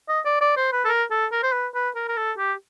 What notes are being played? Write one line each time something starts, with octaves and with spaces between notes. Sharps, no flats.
D#5
D5
D5
C5
B4
A4
A#4
A4
A#4
C5
B4
B4
A#4
A#4
A4
G4